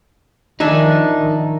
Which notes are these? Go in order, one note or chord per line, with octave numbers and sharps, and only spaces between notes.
D#3 F3 D4 D#4 E5 G#5